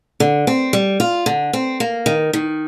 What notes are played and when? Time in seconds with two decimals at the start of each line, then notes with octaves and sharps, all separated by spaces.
0.20 D3
0.47 C4
0.73 G3
1.00 F4
1.26 D3
1.53 C4
1.80 A#3
2.06 D#3
2.33 D#3